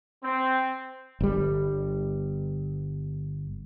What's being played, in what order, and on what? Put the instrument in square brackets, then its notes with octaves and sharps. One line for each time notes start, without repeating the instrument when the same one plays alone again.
[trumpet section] C4
[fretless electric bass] G1 G3